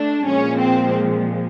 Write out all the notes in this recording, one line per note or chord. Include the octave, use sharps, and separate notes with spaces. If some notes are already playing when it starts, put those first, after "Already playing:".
Already playing: A3 D4
A#2 F3 G#3 C#4
C4